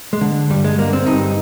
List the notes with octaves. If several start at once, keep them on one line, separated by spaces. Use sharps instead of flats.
G#3
D3
G2 G3
G#3
D3 A#3
C4
G2 D#4